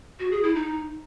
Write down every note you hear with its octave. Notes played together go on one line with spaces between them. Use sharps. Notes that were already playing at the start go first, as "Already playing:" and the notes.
F#4
G#4
E4
D#4